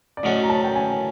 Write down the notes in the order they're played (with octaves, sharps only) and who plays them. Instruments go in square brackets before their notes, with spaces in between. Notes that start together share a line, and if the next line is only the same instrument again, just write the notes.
[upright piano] D5
[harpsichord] A2 F#3 A3 C#4 F#4 [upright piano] D#5
[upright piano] A#5
A5
G5
G#5